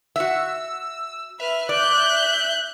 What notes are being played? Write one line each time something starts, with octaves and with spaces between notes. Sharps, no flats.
F#4 E5 E6
B4 E5 F6
D5 F#6 G6